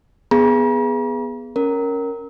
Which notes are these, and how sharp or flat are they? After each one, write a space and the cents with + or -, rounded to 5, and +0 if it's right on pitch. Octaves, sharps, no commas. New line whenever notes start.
B3 +0 G#4 +0 A#5 +45
C#4 +0 A#4 +0